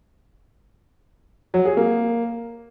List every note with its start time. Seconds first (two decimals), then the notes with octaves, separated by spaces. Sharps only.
1.54 F#3
1.65 G#4
1.77 A#3